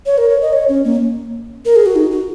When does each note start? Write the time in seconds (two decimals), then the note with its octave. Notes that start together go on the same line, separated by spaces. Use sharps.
0.06 C#5
0.18 A#4
0.30 C#5
0.42 D#5
0.53 C#5
0.69 C#4
0.85 A#3
1.65 A#4
1.76 G#4
1.86 F#4
1.96 D#4
2.11 F#4